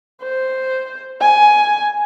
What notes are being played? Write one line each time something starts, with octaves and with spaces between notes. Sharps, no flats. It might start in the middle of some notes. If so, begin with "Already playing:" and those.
C5
G#5